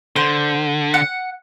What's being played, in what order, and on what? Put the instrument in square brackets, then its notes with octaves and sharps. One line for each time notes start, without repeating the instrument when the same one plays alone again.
[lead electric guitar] D3 [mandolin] C5
[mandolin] F#5